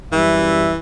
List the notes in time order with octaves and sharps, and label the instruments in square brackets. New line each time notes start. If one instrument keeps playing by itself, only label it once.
[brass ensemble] F#2 G3 E5 [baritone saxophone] E3